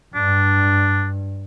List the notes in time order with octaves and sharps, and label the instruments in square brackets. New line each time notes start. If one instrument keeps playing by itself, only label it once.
[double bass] G2 [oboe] D4